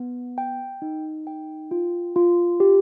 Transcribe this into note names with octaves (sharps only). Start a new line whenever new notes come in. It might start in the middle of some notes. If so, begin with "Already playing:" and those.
Already playing: B3
G5
D#4
G5
F4
F4
G4